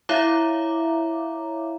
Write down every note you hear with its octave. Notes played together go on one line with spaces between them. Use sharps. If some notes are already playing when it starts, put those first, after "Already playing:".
E4 C#5 E5 F5 A#5 D6